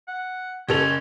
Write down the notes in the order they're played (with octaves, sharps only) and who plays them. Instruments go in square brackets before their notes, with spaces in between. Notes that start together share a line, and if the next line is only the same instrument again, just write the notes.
[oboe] F#5
[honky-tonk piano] F#1 A4 F7 [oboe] C#4